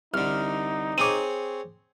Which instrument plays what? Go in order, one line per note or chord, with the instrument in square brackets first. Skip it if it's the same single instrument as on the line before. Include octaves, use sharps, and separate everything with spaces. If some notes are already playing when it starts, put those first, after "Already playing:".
[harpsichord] C2 D3 [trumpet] D#4 [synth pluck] F6
[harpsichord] C4 G#4 C#5 [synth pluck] D6 D#7